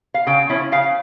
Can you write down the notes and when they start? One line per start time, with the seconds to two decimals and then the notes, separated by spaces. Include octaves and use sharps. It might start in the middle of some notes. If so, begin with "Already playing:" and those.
0.14 F5
0.27 C#3 G5
0.49 F3 C#4 E4
0.72 C#3 F5